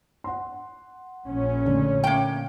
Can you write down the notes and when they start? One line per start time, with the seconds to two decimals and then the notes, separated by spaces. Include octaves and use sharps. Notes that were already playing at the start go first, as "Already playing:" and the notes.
0.24 F#5 C6
1.27 A#1 A#2 C#4
1.66 D3 A3
2.04 A#3 G5